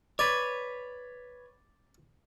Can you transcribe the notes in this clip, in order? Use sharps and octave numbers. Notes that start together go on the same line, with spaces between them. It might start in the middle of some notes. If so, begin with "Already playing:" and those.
B4 C#5 D5